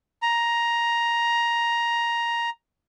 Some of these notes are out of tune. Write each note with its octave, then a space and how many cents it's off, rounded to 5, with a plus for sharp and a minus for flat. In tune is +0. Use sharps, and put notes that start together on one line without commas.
A#5 +10